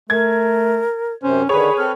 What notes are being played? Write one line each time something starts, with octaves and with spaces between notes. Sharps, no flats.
A3 A#4 G#6
F#2 C3 C#4 C5
D3 D#3 G#4 B4 C#5 B5
C4 A4 F6